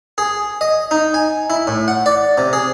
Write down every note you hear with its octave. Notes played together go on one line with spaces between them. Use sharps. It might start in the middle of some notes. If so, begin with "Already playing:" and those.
G#4
D#5
D#4
G#5
E4
A2
F#5
D5
C3
G#4